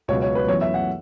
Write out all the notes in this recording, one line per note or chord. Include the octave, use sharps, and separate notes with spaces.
C#2 B2 F#3 B3 C#5
C#5
B4
F#2 E3 B3 C#5
E5
F#5